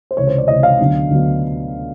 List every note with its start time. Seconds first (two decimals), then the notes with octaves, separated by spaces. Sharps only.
0.11 C5
0.17 C#2 C3 E3 C#5
0.27 C5
0.38 D5
0.48 C#2 C3 E3 D#5
0.63 F5
0.79 D2 D3 F#3 B3 D4
1.10 D2 D3 F#3 B3 D4